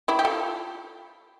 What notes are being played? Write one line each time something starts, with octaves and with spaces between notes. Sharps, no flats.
E4 G4
G4
F4 A4